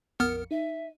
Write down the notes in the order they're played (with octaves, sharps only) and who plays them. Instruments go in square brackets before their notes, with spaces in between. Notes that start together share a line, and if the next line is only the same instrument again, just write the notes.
[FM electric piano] A#1 F2 C#7 [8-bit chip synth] B3 F6 [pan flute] A#4
[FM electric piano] D#4 [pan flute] E5